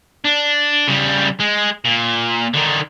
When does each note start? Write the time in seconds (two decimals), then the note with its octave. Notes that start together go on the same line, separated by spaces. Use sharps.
0.24 D4
0.88 C#3 G3
1.40 G#3
1.85 A#2
2.54 D3 D#3